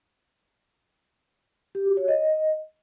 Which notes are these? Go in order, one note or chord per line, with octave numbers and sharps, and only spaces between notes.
G4
F#4
C#5
D#5